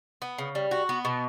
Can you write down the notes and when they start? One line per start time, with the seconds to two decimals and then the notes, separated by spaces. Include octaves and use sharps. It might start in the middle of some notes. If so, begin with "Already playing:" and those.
0.22 B3
0.38 C#3
0.55 G3
0.71 F#4
0.89 B3
1.05 B2